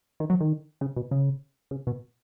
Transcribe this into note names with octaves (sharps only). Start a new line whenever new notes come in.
D#3
F#3
D#3
C#3
B2
C#3
C#3
B2